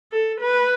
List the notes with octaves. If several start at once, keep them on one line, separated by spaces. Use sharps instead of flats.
A4
B4